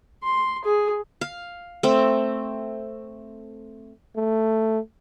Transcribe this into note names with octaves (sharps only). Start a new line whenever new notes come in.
C6
G#4
F5
A3 C4
A3